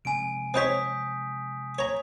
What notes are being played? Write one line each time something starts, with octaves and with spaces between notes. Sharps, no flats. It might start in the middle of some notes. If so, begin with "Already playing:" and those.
C3 F3 G#3 G#5 D7
C4 D#4 C#5 D#6 G6 B6
C#5 A#5